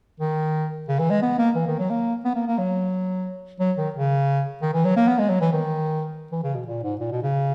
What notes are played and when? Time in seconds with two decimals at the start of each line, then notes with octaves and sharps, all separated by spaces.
0.20 D#3
0.88 C#3
0.99 E3
1.10 G#3
1.22 B3
1.39 A#3
1.55 E3
1.67 D#3
1.79 F#3
1.90 A#3
2.25 B3
2.36 A#3
2.47 A#3
2.58 F#3
3.60 F#3
3.77 D#3
3.94 C#3
4.62 D#3
4.74 E3
4.85 F#3
4.96 A#3
5.08 B3
5.19 G#3
5.30 F#3
5.41 E3
5.52 D#3
6.32 E3
6.43 C#3
6.55 B2
6.67 A#2
6.83 G#2
7.00 A#2
7.12 B2
7.23 C#3